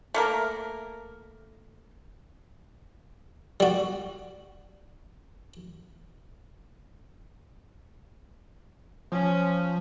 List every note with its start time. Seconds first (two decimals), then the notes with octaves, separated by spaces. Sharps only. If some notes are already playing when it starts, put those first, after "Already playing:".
0.14 A3 A#3 A#4
3.60 G3 F#4
9.12 F3 C#4